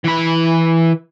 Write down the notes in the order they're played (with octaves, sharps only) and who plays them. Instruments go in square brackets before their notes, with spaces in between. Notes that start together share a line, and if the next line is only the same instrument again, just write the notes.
[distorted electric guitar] E3 B5